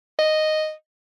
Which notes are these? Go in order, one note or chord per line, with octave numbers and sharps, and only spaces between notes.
D#5